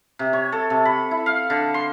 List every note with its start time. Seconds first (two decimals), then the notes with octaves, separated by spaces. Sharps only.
0.19 C3
0.33 C#5
0.52 A4
0.70 C3
0.85 B5
1.11 E4
1.26 F5
1.50 D3
1.74 C6